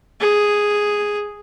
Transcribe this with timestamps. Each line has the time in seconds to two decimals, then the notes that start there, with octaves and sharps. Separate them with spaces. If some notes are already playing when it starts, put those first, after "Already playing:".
0.20 G#4